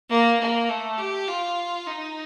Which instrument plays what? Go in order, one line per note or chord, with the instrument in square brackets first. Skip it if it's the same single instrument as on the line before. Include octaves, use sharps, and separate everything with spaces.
[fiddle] A#3
A#3
A3
G4
F4
D#4